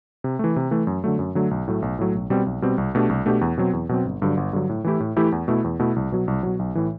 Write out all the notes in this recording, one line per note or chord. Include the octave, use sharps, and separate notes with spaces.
C3
E3 A3
C3
E3 A3
F#2
D3 F#3 A3
F#2
D3 F#3 A3
B1
A2 F#3 A3
B1
A2 F#3 A3
B1
B2 G3 C4
B1
B2 G3 C4
C2
B2 A3 D4 G4
C2
B2 A3 D4 G4
E2
B2 F#3 C4
E2
B2 F#3 C4
G1
G2 D3 F#3
G1
G2 D3 F#3
A2
E3 A3 E4 G4
A2
E3 A3 E4 G4
E2
B2 A3 E4
E2
B2 A3 E4
C2
B2 F#3
C2
B2 F#3
B1
A2 E3